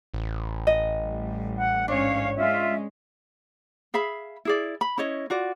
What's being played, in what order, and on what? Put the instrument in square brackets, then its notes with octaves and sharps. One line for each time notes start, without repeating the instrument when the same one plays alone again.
[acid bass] A1
[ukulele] D#5
[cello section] A2 G3
[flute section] F#5
[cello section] G#2 C#4 C#5 [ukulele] D4 [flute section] F5
[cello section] G#3 C#4 [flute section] F4 E5
[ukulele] G#4 E5 F5 B5
E4 G#4 D5
B5
C#4 E4 C#5 D#5
F4 F#4 D5